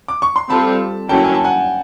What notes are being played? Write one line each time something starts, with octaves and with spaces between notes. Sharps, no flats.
D6
C#6
C6
G3 C4 F4 A4 A5 B5
D3 F#3 A#3 C#4 E4 G5 A5
G#5
A5
F#5 G#5